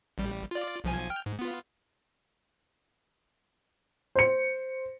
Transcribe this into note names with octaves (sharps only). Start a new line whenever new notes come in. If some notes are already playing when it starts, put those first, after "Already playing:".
A1 G3
F4 D5
B1 F3 G#5
G5 F6
G#2
B3 F4
C5 C#7